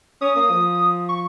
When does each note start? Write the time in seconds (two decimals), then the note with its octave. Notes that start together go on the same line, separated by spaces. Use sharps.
0.21 C#4 D#6
0.35 A#3 D#6
0.49 F3
1.09 C#6